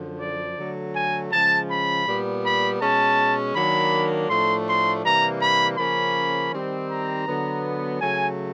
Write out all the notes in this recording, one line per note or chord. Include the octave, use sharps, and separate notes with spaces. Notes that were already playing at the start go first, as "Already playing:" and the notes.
Already playing: F#2 D3 F3
D5
D3 F#3 A3
G#5
C#3 F3 G#3 C#4 A5
B5
A#2 G3 B3
B5
B2 G#3 C#4 A5
D#3 F#3 A#3 D4 B5
A2 F3 A3 D4 C6
C6
C3 E3 G3 A#3 A#5
B5
C#3 F3 A#3 C#4 B5
D#3 G3 C4 D#4
A#5
D3 F#3 B3
C#3 F#3 A3 G#5